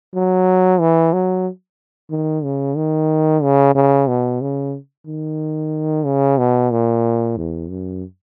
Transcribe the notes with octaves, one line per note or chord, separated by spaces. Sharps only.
F#3
E3
F#3
D#3
C#3
D#3
C#3
C#3
B2
C#3
D#3
C#3
B2
A#2
E2
F#2